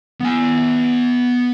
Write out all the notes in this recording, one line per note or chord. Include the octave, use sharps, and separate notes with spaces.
B3 G#5